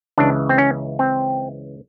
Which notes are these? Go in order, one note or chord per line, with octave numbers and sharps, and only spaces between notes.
C#2 C#3 E3 D4
C4
C#4
C4